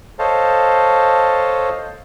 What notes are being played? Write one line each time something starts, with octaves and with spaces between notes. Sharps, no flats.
A4 C5 C#5 D#5 F5 A5